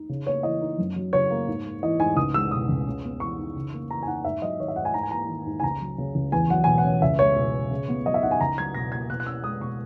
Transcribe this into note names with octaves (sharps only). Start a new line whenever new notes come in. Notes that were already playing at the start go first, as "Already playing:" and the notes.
Already playing: D#4
C#3
A#3 C#5
E3 D#5
D#4
F#2
F#3
C#3 C#5
A#3
G#2
A#3
E3 D#5
G#2 G#5
C#2 D#6
G#3 E6
B2 D#6
C#2
C#3
B3
E3 C#6
D#4
C#3
A#3
E3 A#5
G#5
D#4 F#5
G#2 E5
F#3 D#5
D#3 C#5
E5
G#2 F#5
G#5
G#2 A#5
G#5
A#3 A#5
D#3
G#2
G#5
C#2 A#5
F#3
C#3
C#2
E2 G#5
F#3 F#5
B2 G#5
F#5
C#4
C#2 E5
G#3 C#5
B2
C#4
C#3
B3
F#3 D#5
E5
D#4 F#5
G#5
C#2 A#5
F#3 G#6
B2 A#6
A#3 G#6
B2 F#6
F#6
C#4 E6
G#3 D#6
B2 C#6